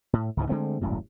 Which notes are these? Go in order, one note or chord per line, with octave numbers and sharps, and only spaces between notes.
A2
C#2 G#2 E3
D3 G#3 A3 C4
D#1 G#1 F#2 A2